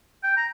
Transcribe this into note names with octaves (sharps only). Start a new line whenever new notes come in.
G5
A#5